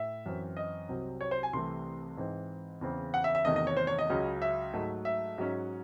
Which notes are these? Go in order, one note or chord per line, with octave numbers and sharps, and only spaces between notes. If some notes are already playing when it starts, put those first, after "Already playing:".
Already playing: A2 E5
F#2 E3 C4
D#5
C2 C3 F#3 C4
C#5
C5
G#5
C2 C3 E3 A3 C6
G#2 E3 C4
E2 C#3 E3 C4
F#5
E5
E5
E2 C3 D#3 A3 D#5
D#5
C#5
C5
C#5
D#5
C#2 C#3 F#3 C#4
E5
G#2 F#3 A3
E5
G#2 F#3 C#4